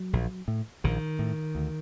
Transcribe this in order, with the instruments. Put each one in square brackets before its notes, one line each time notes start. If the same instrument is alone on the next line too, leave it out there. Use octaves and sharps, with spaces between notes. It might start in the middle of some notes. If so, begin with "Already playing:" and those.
Already playing: [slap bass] F#3
A#1
A2
A#1 D#3
A2
D2